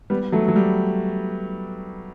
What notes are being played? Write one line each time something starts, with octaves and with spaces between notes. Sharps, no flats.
G3 B3
F#3 A3
F#3
G3